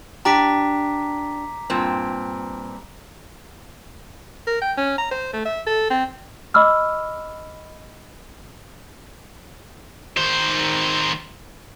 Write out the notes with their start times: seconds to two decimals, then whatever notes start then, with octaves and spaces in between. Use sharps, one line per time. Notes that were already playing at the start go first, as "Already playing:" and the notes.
0.25 D4 G4 A#5 D6 B6
1.70 G2 A#2 C4
4.47 A#4
4.62 G5
4.77 C#4
4.98 A#5
5.11 C5
5.33 A3
5.46 E5
5.67 A4
5.90 C4
6.54 D#5 B5 D6 E6 F6
10.17 D#3 C5